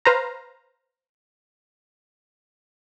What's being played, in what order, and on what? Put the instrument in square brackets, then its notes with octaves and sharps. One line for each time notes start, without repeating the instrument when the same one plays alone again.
[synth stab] B4 C5 F5 A#5